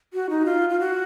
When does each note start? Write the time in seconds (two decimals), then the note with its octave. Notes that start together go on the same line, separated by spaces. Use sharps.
0.14 F#4
0.30 D#4
0.46 F4
0.69 F4
0.80 F#4